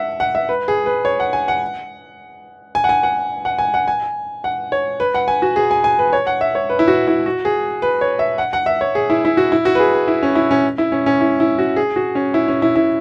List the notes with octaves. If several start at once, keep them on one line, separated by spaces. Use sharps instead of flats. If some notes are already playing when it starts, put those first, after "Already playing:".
Already playing: E5 F#5
F#5
E5
B4
G#4
B4
C#5
F#5
G#5
F#5
G#5
F#5
G#5
F#5
F#5
G#5
F#5
G#5
F#5
C#5
B4
F#5
G#5
F#4
G#4
G#5
G#5
B4
C#5
F#5
E5
C#5
B4
E4
F#4
E4
F#4
G#4
B4
C#5
E5
F#5
F#5
E5
C#5
G#4
E4
E4
F#4
E4
F#4
B4
G#4
G#4
E4
C#4
E4
C#4
E4
C#4
C#4
E4
E4
F#4
G#4
F#4
C#4
E4
C#4
E4
E4